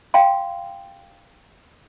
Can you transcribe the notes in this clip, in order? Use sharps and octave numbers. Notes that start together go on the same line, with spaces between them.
F5 G5 C6